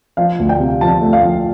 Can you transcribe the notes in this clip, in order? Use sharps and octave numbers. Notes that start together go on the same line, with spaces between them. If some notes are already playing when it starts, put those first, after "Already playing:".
F3 F5
D2
G5
C3
F3 A5
A3
F5
F3